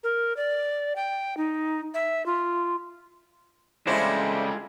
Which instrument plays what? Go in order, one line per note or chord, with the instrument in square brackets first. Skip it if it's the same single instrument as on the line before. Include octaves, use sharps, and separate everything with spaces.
[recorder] A#4
D5
G5
D#4
E5
F4
[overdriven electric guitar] C#3 G3 [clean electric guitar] G#3 D4 [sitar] E4 C5 [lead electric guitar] F4 A4